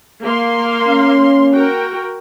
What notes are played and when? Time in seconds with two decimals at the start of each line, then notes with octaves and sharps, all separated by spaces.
0.23 A#3 F5 C6
0.87 C#4
1.53 F#4 A#4 G5